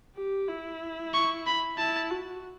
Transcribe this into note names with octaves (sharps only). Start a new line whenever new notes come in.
G4
E4
C#6
B5
E4 A5
F#4